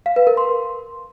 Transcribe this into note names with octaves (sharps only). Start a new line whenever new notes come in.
F5
B4
A#4
C6